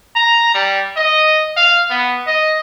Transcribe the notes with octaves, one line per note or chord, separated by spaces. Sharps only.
A#5
G3
D#5
F5
B3
D#5